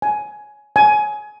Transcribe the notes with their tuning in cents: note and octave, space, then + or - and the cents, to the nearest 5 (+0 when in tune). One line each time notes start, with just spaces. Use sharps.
G#5 +15
G#5 +20